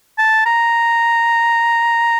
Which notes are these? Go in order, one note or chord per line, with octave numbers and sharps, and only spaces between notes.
A5
A#5